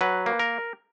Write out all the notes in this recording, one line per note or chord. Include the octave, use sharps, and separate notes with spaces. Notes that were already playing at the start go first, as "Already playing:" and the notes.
F#3 B4
A#3
A#4